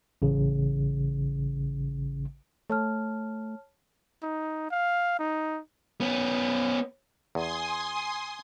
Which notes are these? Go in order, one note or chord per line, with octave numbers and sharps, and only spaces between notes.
A1 C#3
A3 C#5 A5 F6
D#4
F5
D#4
B3 C#4
E2 G#5 C6 D#6